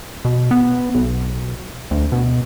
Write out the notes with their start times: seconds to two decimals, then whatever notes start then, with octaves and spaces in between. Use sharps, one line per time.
0.25 B2
0.51 B3
0.95 B1
1.91 D2
2.12 B2